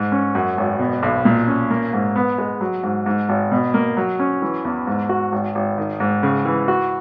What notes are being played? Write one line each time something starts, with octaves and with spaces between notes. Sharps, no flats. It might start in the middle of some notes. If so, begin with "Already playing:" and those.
Already playing: G#2
C#4
F#2
G#1
B2
B1
A#2
C#4
A#3
G#2
B3
G#3
F#3
G#2
G#2
G#1
B2
A#3
F#3
C#4
E3
E2
G#2
F#4
G#1
G#1
D#3
G#2
C#3
E3
F#4